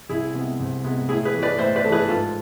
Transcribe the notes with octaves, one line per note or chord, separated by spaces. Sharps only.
C2 E4 G#4
C3 G#3 B3
C2
C3 G#3 B3
A2 E4 G#4
G#4 B4
E3 A3
B4 D5
A2 C5 E5
B4 D5
E3 A3 A4
G#4 B4
G#2 F4 A4